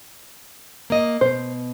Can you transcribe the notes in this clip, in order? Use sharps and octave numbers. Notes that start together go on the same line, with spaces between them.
A#3 D#5
B2 C5